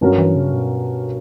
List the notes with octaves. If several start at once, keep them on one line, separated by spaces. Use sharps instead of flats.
G2 F#3 C#4 F#4 A#4
E3
C#3
B2